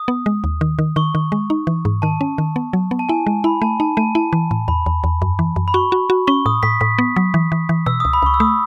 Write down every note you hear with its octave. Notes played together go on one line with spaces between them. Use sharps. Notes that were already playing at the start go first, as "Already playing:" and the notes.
Already playing: D#6
B3
G#3
D#2
D#3
D#3
D#3 C#6
D#3
G#3
D#4
E3
G#2
D#3 A5
C#4
D#3
B3
F#3
B3
A5
E4 G#5
G#3
E4 B5
A3 A5
D#4 A5
A3 A5
E4 A5
E3
A2
E2 B5
E2
E2
F#2
E3
F#2
B5
F#4 C#6
F#4
F#4
C#4 C#6
A2 D#6
A2 B6
A2 B6
B3
F#3
E3
E3
E3
B2 E6
C#2 D#6
B5
C#2 C#6
E6
A3 D#6